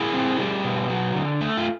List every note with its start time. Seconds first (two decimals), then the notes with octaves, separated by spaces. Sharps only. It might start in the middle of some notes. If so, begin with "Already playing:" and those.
Already playing: E4 G#4 A#4
0.14 C4
0.40 G3
0.64 B2
0.89 F#3
1.15 D3
1.41 A3
1.57 F4